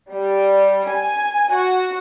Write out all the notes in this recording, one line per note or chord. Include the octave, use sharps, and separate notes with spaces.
G3
G#5
F#4